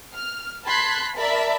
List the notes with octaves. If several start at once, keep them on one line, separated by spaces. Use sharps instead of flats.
F6
A5 B5 C6 F#6 G#6 B6
A#4 D5 E5 A5 B5